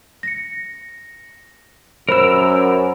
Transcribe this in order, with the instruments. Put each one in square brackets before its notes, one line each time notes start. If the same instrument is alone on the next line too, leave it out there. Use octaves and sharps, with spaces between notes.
[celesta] A#6 C#7
[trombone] F#2 [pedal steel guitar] A#4 E6 [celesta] C5 B5 E7